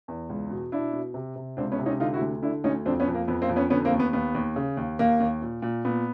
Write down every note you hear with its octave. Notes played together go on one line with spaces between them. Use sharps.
E2
C#2
B2
B2 D4 E4
B2
C3
C3
C#2 C4 D4
B3 C#4
C3
C#4 D#4
D3 D#4 F4
E4 F#4
D2
D3 D4 E4
D2 C#4 D#4
F2 C4 D4
B3 C#4
F2
A#3
F2 B3
A#3 C4
F2
B3 C#4
D3 B3 C#4
A#3 C4
D#2
B3
D#2 B3
D#2
C#3
D#2
D#2 A#3
D#2
A#2
A#2
A#2 B3